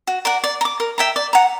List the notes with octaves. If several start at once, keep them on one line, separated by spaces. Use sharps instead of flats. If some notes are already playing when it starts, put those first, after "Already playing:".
F#4
A#4 D5 F#5
D5
A#5
D6
A#4
E5 G5 A#5
D5
F#5 A#5